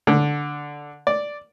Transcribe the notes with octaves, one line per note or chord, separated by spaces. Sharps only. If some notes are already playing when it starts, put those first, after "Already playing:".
D3
D5